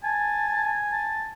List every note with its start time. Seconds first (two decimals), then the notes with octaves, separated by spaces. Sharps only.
0.04 G#5 A5
0.92 A5